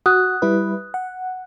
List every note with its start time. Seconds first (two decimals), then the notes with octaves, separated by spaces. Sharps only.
0.06 F#4 D#6 F#6
0.42 G3 E4 B4
0.94 F#5